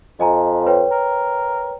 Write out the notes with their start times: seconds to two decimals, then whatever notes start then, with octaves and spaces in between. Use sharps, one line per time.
0.20 F2 D#5 G#5 A#5
0.66 B4 C#5 G5
0.91 A#4